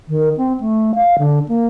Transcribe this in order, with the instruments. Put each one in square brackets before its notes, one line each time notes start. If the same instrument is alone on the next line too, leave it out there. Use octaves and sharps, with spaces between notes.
[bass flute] D#3
C4
A3
F5
D3
A#3